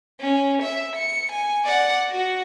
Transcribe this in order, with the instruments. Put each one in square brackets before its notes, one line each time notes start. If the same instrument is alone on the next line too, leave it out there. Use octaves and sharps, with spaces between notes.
[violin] C#4
E5
C#7
G#5
D5 F#5
F#4